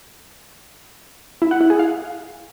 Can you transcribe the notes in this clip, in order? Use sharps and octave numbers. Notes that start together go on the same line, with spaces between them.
E4
F#5
E4
G#4
F5